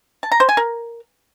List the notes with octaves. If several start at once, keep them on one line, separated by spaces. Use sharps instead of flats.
A5
A#5
C5
G#5
A#4